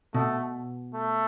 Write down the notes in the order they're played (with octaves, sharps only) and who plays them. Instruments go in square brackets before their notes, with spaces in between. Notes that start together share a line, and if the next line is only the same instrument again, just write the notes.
[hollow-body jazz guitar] B2 [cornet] A3
[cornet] A3